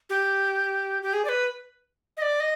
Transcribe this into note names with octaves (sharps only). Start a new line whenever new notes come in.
G4
G4
G#4
D5
B4
D#5
D5
D#5